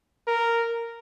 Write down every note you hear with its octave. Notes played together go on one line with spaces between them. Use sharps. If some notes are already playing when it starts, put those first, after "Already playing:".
A#4